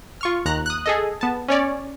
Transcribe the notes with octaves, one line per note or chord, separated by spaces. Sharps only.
F4 C#6 F6
D#2 A#5 F#6
D#6 F#6
G#4 A4 D#5
B3 A5
C#4 C#5 D5